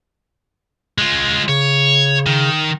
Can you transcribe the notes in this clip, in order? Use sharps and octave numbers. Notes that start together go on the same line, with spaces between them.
G#3 F4
C#3 C#5
D#3